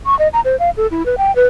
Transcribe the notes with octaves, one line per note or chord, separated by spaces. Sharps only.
C#6
D#5
A#5
C5
F5
A4
E4
B4
G5
B4